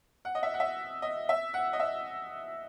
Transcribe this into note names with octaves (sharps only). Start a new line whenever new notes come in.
F#5
D#5
E5
F#5
E5
D#5
E5
F#5
D#5
E5